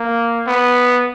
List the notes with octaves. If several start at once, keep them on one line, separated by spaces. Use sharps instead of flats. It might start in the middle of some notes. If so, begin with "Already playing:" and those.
Already playing: A#3
B3